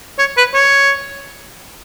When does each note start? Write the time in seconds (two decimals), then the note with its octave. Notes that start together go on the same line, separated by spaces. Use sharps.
0.19 C#5
0.38 B4
0.54 C#5